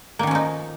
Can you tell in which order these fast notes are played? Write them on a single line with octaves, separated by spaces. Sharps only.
A#3 D#3 C#4 F3 D#4